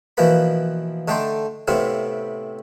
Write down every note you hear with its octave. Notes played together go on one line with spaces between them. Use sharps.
B2 E3 F3 A#3 B4 B5
D3 A3 D4 D#4 G5 C6
A2 C3 B3 C4 E4 F5